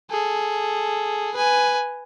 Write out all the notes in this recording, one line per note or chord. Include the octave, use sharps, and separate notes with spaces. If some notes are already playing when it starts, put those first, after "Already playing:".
G#4 A4
B4 G#5